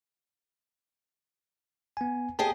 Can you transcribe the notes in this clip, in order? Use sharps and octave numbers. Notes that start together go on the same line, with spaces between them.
B3 G#5
G4 G#4 D#5 G5 A5